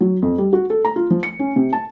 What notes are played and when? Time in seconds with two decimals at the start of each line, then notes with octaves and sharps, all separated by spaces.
0.01 F#3
0.22 F2
0.38 G3
0.53 F#4
0.70 A4
0.85 A#5
0.96 F4
1.10 F3
1.23 C#7
1.39 C#4
1.56 C3
1.73 A5